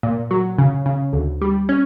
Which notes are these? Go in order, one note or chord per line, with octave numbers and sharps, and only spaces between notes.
A#2
F#3
C#3
C#3
D2
G3
C#4